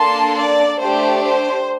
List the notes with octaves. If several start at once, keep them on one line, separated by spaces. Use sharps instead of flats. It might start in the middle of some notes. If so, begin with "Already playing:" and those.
Already playing: A#3 D4 A4 A5 C6
D5
A3 D4 G4 C5
C5